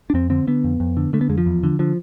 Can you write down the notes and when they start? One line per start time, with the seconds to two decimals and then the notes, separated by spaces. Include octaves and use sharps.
0.10 D4
0.14 F2 C4
0.30 D3 C4
0.47 D3 B3
0.64 F2
0.80 F2
0.97 D3
1.13 D3 A3
1.21 B3
1.29 F2 G#3
1.38 F3
1.46 E2
1.63 D3
1.79 D3 F3